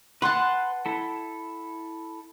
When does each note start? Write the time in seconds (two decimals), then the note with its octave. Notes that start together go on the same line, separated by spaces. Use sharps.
0.22 B4 F#5 A5 C6 F#6
0.86 E4 A4